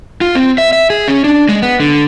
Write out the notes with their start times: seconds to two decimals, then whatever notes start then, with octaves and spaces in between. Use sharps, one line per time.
0.21 F4
0.35 C4
0.58 E5
0.73 E5
0.90 G#4
1.08 C#4
1.24 D4
1.49 G#3
1.62 B3
1.80 D3